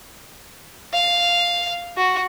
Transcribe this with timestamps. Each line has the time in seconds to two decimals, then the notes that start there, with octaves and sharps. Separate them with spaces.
0.93 F5
1.97 F#4